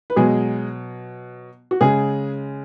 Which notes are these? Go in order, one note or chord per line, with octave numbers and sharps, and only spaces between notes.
B4
B2 F#3 G#3 G#4
F#4
C#3 G#3 G#4